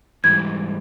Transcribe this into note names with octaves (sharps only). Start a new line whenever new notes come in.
G#2 E3 G3 G#6